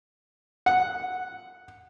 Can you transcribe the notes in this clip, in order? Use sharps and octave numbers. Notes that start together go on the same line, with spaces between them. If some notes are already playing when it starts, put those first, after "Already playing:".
F#5